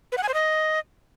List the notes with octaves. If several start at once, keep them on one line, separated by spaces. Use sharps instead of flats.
B4
F#5
G#5
C5
D#5